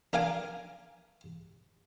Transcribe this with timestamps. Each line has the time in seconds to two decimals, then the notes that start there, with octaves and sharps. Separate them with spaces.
0.13 D4 A#4 F5 G#5 D6